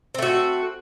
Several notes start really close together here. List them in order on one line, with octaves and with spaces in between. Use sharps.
C4 A3 F#4